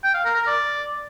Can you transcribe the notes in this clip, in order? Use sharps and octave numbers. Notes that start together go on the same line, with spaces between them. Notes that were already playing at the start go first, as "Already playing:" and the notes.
G5
F5
A#4
A#4
D5